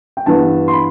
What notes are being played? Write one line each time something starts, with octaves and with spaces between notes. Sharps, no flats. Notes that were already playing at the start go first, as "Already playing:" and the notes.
G5
G2 E3 B3 A5
C6
B5